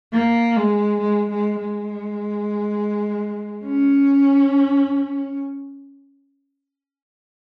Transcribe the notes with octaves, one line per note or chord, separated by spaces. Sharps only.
A#3
G#3
G#3
G#3
G#3
C#4